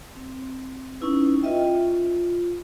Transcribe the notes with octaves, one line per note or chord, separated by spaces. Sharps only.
C4
C#4 D#4 E4 B4
F4 B4 D#5 E5 G5
F4